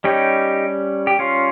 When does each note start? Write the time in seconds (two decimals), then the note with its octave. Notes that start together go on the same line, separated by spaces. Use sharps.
0.04 G3 C#4 D#4 G4
1.07 G4
1.19 C#4 F4